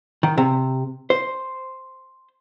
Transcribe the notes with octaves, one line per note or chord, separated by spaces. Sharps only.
D#3
C3
C5